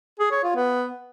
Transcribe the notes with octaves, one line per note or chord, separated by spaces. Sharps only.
G#4
C#5
F4
B3